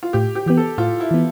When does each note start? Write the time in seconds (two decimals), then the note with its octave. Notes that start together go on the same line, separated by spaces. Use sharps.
0.03 F4
0.13 A2 G4
0.35 G4
0.46 E3 B3 G4
0.57 A4
0.78 A2 F4
1.00 E4
1.11 E3 B3